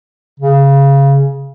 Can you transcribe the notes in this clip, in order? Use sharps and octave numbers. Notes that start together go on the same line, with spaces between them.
C#3